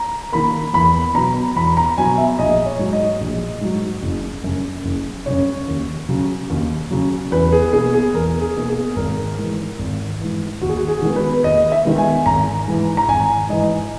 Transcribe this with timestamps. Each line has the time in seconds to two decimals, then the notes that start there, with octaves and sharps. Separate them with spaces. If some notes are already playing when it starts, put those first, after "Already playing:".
Already playing: A#5
0.32 D#3 A#3 B5
0.74 E2 B5
1.15 B2 F#3 A#5
1.56 E2 B5
1.77 A#5
1.98 B2 F#3 G#5
2.18 E5
2.39 A#1 D#5
2.66 C#5
2.79 G#2 F#3
2.93 D#5
3.21 A#1
3.61 G#2 F#3
4.03 F#1
4.44 F#2 C#3
4.85 F#1
5.26 F#2 C#3 C#5
5.68 D#2
6.09 C#3 F#3
6.50 D#2
6.91 C#3 F#3
7.31 E2 B4
7.52 G#4
7.73 B2 A#3 G#4
7.94 G#4
8.14 E2 A#4
8.41 G#4
8.56 B2 A#3
8.69 G#4
8.96 G#1 A#4
9.38 G#2 E3
9.79 G#1
10.20 G#2 E3
10.61 D#2 F#4
10.69 G#4
10.77 F#4
10.88 G#4
11.02 D#3 G#3 B3
11.16 B4
11.43 D#2 D#5
11.72 E5
11.85 D#3 G#3 B3
11.98 G#5
12.26 G#1 A#5
12.68 G#2 E3
12.97 A#5
13.08 G#1 G#5
13.49 G#2 E3 D#5